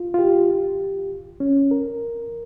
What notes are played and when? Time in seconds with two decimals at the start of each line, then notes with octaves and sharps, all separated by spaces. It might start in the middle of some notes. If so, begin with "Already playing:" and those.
Already playing: F4
0.14 F4
0.19 G4
1.40 C#4
1.71 A#4